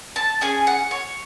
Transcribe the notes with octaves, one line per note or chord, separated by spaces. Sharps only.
A5
C#4 G#4 G#5
F#5
C#5